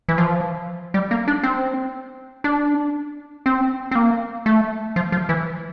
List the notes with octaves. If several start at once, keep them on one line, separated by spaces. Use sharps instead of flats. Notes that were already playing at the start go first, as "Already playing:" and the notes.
E3
F3
G3
A#3
D4
C4
D4
C4
C4
A#3
A3
F3
F3
E3